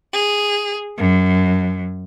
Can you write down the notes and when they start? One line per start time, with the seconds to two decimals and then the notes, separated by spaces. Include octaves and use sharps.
0.13 G#4
0.98 F#2